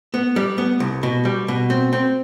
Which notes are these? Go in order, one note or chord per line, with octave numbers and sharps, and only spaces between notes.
B3
G3
B3
C2
B2
G3
B2
C4
C4